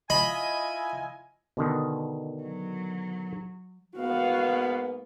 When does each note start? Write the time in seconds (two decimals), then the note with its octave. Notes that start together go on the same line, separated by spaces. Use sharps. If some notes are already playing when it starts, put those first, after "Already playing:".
0.10 E4 F4 D#5 G#5 B5
1.57 B2 D3 D#3
2.43 F#3
3.96 G#2 A#3 B3 F#4 F5